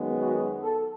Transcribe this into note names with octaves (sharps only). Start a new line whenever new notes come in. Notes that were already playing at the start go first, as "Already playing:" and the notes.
Already playing: F#2 D#3 G#3 B3
F#4
A4